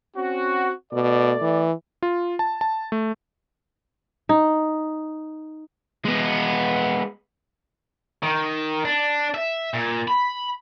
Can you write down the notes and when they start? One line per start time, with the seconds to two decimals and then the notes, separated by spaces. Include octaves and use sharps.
0.16 C4 C#4 F#4
0.93 B2 A3 A4 D5
1.41 E3
2.03 F4
2.39 A5
2.61 A5
2.92 A3
4.29 D#4
6.05 G#3 B3
8.23 D#3
8.85 D4
9.34 E5
9.74 A#2
10.08 B5